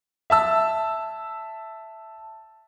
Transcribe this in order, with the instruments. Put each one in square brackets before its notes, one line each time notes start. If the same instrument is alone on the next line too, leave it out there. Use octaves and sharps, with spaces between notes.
[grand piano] E5 A5 E6